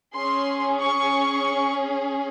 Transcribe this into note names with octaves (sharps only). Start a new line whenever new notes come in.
C#4 G#4 C6
C#6